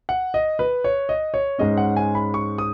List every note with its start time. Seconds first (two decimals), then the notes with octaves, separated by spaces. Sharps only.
0.09 F#5
0.34 D#5
0.59 B4
0.84 C#5
1.09 D#5
1.34 C#5
1.59 G#2 G#3 C#4 D#5
1.77 F#5
1.97 G#5
2.15 B5
2.34 C#6
2.58 D#6